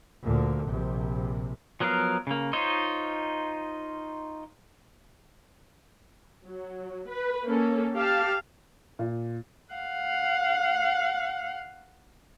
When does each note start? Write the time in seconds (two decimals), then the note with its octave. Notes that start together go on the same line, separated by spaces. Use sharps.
0.22 D2 A#2 D3
0.67 A#1 C3
1.80 F3 F#3 B3 A#4 F5
2.27 C#3 A#3
2.53 D#4 F4 C5 C#5 D#5
6.46 F#3
7.08 B4
7.47 A#3 C#4 A4
7.95 G4 F5 A5
8.99 A#2
9.74 F5 F#5